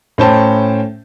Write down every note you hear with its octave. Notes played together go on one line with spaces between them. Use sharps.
A2 C#4 C5 G5 A5